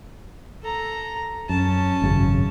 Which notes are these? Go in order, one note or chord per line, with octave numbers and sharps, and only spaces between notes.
A4 A#5
F#2 C#4 A5
G#1 F#2 C#3